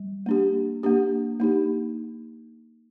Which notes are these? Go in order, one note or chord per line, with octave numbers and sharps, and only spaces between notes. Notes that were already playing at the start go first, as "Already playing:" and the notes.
Already playing: G3
A#3 D4 G4
A#3 D4 G4
A#3 D#4 G4